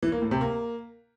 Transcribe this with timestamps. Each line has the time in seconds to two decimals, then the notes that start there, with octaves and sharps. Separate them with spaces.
0.03 E3
0.12 A#3
0.22 A2
0.31 C3
0.41 A#3